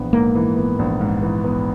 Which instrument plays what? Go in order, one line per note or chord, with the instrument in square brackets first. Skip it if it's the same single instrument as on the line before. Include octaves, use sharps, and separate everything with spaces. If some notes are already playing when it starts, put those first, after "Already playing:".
Already playing: [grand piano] A#1 E3 B3
[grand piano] G#2 [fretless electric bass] A#3
[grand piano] E3
B3
A#1
G#2
E3
B3